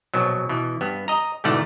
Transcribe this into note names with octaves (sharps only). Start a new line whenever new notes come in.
A#1 B2 F#3
B2 E3
G2 B3
D#5 A#5
G#2 B2 D3 E3 A3 F#5